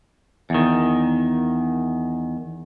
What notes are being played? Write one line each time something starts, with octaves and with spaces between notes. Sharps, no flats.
E2 D#3